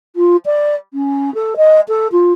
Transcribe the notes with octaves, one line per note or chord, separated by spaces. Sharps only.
F4
D5
C#4
A4
D#5
A4
F4